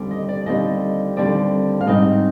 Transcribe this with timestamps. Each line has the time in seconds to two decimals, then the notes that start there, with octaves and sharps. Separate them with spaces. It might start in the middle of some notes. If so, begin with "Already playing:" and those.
Already playing: D#2 D3 G3 C4
0.11 D#5
0.29 D5
0.46 D#2 D3 G3 C4 D#5
1.16 D#2 D3 G3 C4 D5
1.81 F5
1.87 G#2 G3 C4 D#4 D#5